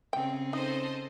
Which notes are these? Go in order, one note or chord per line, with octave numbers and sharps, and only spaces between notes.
C#3 C4 G5
D#4 A4 C5 D#5